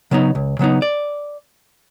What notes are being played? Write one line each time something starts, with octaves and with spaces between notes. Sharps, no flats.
C#3 F#3 B3 D#4
C#2
C#3 F#3 B3 D#4
D5